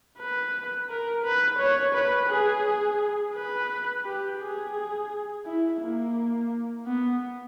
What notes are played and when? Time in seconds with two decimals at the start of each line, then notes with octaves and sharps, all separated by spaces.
0.18 B4
0.90 A#4
1.24 B4
1.59 C#5
1.95 B4
2.29 G#4
3.35 B4
4.05 G4
4.41 G#4
5.46 E4
5.82 A#3
6.87 B3